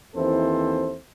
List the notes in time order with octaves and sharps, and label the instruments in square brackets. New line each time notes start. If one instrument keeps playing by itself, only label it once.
[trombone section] D#2 E3 C4 E4 A4 C5